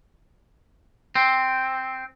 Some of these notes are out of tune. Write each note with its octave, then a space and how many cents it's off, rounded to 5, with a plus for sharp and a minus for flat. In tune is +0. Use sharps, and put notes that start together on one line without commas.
C4 +0